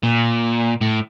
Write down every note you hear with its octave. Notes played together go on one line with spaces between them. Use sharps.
A#2
A2